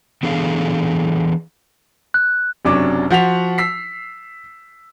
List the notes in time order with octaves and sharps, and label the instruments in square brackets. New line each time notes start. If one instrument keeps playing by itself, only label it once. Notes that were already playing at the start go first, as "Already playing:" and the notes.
[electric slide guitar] E3 B3 D4 G#4 A4 F5
[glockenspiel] F#6
[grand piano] F#1 C3 F#3 C#4 D4 D6
F3 F#4 F#5 B6 F7
E6 B6 C7